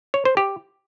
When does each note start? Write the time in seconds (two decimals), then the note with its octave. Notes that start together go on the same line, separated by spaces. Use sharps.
0.14 C#5
0.25 C5
0.37 G4